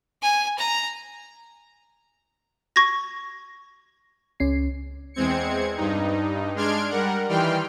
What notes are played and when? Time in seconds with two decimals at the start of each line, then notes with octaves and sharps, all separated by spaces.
0.22 G#5
0.58 A#5
2.76 C#6 G#6 A#6
4.40 C#2 C#4 C7
5.14 E2 G#3 C4 G#6 C#7
5.77 G2 D#4
6.55 G#3 D4 C6 F6 G#6 D7
6.90 G3 A#4 F#5
7.29 D#3 E3 G3 G5 C6 F6